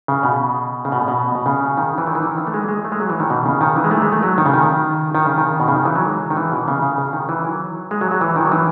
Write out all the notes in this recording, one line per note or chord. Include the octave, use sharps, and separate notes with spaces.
C#3
B2
C#3
B2
B2
B2
C#3
D#3
E3
D#3
E3
D#3
E3
A3
G#3
G#3
A3
G#3
F#3
E3
D#3
B2
C#3
D#3
E3
G#3
A3
G#3
A3
F#3
D#3
C#3
D#3
D#3
C#3
D#3
B2
C#3
D#3
E3
F#3
G#3
D#3
E3
B2
C#3
C#3
C#3
D#3
E3
F#3
G#3
F#3
F#3
E3
D#3
F#3
E3